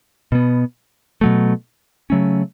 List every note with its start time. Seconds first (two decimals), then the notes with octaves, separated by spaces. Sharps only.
0.32 B2 B3
1.21 B2 F#3 A3
2.10 C#3 F#3 A3 C#4